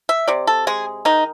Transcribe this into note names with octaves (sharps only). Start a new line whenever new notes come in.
E5
C3 D5
A4
G#3 G#4
D#3 D#4